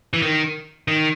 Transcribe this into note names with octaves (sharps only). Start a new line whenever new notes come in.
E3
D#3
D#3